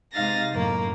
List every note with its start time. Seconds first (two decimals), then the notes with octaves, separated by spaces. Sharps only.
0.13 C3 G#3 D#4 F5 A6 A#6
0.51 F#2 A2 A#3